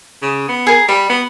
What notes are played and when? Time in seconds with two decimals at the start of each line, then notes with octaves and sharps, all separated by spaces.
0.22 C#3
0.48 B3
0.67 G#4 A#4
0.89 G3 B5
1.09 B3